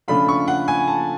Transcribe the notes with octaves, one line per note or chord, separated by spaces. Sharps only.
C#3 F3 A3 D4 F4 B5
C#6
F#5
G#5
A5